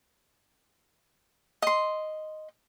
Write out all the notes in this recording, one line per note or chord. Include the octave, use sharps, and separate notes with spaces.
D#5 C6